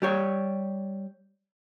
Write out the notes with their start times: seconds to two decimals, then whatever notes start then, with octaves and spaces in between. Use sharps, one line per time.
0.02 G3 G4 C#5